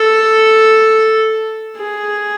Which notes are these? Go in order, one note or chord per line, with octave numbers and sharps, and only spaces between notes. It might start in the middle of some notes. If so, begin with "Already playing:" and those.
Already playing: A4
G#4